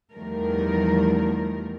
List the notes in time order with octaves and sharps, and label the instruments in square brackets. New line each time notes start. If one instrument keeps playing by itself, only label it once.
[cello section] E2 D#3 F3 G3 A3 A#4